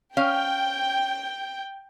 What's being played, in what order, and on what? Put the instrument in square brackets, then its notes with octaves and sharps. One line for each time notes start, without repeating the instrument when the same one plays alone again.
[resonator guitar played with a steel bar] C#4 F5 [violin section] G5